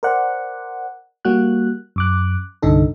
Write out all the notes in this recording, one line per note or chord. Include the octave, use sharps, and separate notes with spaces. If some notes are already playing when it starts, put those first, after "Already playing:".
A#4 C5 D5 F#5
G3 A#3 F#4 F#6
F#2 D6 F#6
C2 G2 D3 D#4 A4